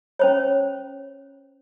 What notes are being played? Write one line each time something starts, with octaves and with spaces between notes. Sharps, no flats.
C#4 C5 C#5